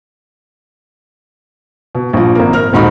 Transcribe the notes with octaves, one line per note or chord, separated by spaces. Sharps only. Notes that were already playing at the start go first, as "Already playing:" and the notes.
B2
A#1 F3
G#1 A#3
A#4 F6
D#1 G#2 D#4 F#4 B5